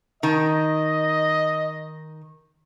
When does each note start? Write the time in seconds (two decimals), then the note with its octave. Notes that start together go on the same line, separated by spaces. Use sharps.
0.23 D#3 D#5